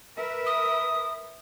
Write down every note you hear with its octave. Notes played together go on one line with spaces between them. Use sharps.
A#4 B4 E5
D#6